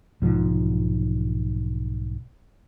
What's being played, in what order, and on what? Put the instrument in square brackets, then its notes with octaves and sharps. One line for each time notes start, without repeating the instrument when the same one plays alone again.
[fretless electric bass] B1 G#2 F3